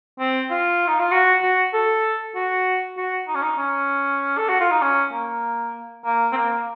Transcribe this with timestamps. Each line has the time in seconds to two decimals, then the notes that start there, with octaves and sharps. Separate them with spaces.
0.19 C4
0.50 F4
0.87 D#4
0.99 F4
1.11 F#4
1.42 F#4
1.73 A4
2.35 F#4
2.97 F#4
3.27 D#4
3.35 C#4
3.42 D#4
3.58 C#4
4.37 A4
4.49 F#4
4.60 F4
4.71 D#4
4.82 C#4
5.12 A#3
6.05 A#3
6.32 C4
6.36 A#3